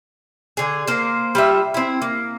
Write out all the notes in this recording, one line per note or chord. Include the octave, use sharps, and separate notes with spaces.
D3 G#4
A#3 C5
G3 F4 E5
C4 E4
A#3